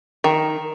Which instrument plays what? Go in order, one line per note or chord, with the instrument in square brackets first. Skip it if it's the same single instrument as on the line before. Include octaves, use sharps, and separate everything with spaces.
[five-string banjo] D#3